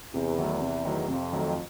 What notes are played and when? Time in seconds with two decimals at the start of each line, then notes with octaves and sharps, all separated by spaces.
0.13 E2 C3
0.38 D#3 F#3 A3
0.61 C3
0.85 D#3 F#3 A3
1.08 F2 C3
1.33 D#3 F#3 A3